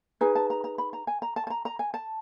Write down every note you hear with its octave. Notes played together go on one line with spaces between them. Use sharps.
D#4 G#4 B4 G#5
A5
A#5
A#5
B5
A#5
G#5
A#5
A5
A5
A#5
A#5
G#5
A5